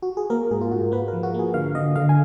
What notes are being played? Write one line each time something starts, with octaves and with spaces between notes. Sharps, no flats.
F#4
G#4
A#3 A#4
G#2 G#4
F4
G#2 F#4
A#3 B4
A#4
F3
F#4
A#3 G#4
D3 F5
D3 D#5
D3 F5
G#5